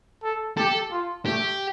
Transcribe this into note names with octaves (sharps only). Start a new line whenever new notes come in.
A4
G4 A4
F4
A3 G4